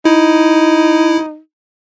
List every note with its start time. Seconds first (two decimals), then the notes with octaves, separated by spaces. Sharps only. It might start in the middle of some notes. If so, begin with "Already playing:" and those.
0.05 D#4 E4